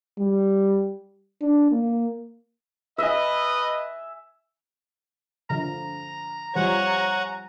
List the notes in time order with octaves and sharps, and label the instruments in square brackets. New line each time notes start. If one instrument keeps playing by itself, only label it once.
[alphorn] G3
D4
A#3
[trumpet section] B4 D#5 [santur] E5 G#5
[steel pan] D3 F3 [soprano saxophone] A#5
[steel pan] F3 G3 C5 [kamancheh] C#5 G#5 [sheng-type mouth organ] F#5